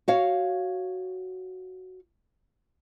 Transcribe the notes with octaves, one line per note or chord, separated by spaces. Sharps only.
F#4 C#5 F5